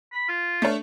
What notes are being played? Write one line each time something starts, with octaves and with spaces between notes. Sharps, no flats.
B5
F4
A3 D4 C#5